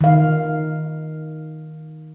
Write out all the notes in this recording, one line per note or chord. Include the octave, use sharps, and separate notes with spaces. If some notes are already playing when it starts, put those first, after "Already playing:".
D#3 F5